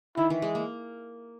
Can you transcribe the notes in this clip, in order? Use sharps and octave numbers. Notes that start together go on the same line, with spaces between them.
D#3 E4
E3
G#3
A#3